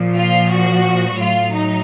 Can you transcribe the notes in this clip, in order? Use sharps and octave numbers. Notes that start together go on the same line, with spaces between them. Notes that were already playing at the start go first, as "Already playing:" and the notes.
Already playing: A#2 F3
F4
F#4
A2 F#3 F4
D#4